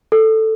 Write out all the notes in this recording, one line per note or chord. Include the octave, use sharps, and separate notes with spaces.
A4